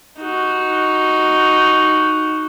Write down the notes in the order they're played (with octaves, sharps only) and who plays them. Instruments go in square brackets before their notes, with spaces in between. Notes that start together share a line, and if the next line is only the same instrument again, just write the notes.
[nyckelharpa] D#4 F#4